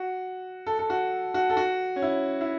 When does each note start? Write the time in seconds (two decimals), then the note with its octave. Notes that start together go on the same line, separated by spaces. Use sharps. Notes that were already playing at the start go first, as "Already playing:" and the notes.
Already playing: F#4
0.66 A4
0.79 A4
0.90 F#4
1.34 F#4
1.50 A4
1.57 F#4
1.96 C#4
2.02 E4
2.41 E4